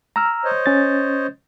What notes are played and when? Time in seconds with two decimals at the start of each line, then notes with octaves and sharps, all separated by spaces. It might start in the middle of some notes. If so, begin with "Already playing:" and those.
0.16 A#5 E6 F6
0.44 C5 C#5 D#5
0.66 C#4 A6